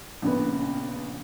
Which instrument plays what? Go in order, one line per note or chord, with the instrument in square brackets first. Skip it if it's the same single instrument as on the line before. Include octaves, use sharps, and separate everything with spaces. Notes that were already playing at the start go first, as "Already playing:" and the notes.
[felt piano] A#1 C#3 B3